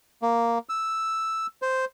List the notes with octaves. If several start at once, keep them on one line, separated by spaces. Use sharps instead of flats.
A#3
E6
C5